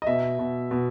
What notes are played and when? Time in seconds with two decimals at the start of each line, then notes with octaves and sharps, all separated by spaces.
0.02 D#5
0.07 B2 E5
0.39 B2
0.71 B2